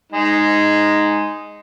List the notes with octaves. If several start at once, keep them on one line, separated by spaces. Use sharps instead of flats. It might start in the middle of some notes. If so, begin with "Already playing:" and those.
G#3 D#4